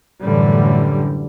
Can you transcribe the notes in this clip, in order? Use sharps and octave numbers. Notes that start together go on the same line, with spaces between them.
F#2 A2 D3 E3 G3